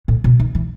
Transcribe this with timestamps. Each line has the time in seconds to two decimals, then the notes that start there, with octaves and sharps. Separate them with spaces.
0.08 A2
0.24 B2
0.40 D#3
0.55 E3